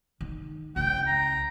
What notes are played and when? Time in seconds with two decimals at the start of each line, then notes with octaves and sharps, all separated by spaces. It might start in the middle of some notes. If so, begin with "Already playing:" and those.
0.21 D#3
0.76 C#2 E4 G5
1.07 A#5